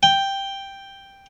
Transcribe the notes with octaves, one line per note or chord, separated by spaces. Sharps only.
G5